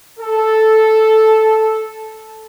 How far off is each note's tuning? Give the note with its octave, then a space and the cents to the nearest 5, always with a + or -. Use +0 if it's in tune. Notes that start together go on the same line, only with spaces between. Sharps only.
A4 -5